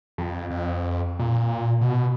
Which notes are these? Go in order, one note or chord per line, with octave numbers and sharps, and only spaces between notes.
F2
F2
A#2
B2